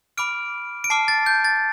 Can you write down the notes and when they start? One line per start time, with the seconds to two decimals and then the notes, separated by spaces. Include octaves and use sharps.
0.17 B5 D6 F6 D7
0.84 D7
0.90 A5 D6 F6 C7
1.08 A6
1.26 G6
1.44 A6